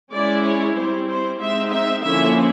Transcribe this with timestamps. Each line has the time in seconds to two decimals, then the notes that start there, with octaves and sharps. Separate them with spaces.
0.12 G#3 C#4 E4 D5
0.44 C#5
0.76 G3 C4 E4 C5
1.08 C5
1.39 G#3 C4 D#4 E5
1.71 E5
2.03 D3 F3 A#3 C#4 E4 E5